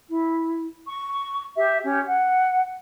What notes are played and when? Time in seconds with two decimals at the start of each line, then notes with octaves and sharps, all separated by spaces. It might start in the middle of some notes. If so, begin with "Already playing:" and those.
0.09 E4
0.87 C#6
1.56 G4 E5
1.84 C#4 G4
2.06 F#5